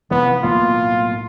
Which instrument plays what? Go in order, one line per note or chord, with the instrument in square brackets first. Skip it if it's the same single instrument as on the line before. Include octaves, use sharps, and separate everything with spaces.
[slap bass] F1 E3 [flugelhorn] B3
[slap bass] B1 A2 A#3 [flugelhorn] F4